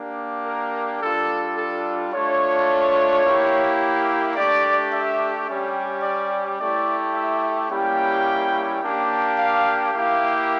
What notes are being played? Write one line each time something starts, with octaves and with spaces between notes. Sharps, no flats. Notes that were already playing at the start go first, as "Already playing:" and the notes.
Already playing: A#3 D4 G4
A#4
G3 D4 F4 A4
A4
A3 D4 F4 C#5
A#3 E4 G4
A3 D4 G4 D5
E5
G3 C#4 G4
D5
A3 E4 G4 D5
E5
G3 A#3 C#4 E4 G4 G5
A#3 D4 G4
F5
A#3 E4 G4 F5